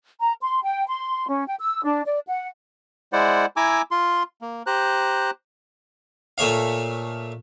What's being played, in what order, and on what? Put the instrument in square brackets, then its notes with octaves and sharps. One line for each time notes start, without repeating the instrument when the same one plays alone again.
[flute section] A#5
C6
G5
C6
C#4
G5
E6
D4
D5
F#5
[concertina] G#3 E4 C5 D5 F#5
E4 G#5 A#5 D6 E6
F4 C6
A#3
G4 C5 A#5 F#6
[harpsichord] A#2 A3 C#5 F5